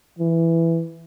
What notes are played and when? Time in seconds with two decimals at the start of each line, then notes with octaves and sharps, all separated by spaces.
0.19 E3